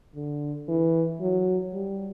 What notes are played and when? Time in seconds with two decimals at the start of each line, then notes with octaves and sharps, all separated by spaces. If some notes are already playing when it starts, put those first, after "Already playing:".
0.16 D3
0.69 E3
1.21 F#3
1.74 G3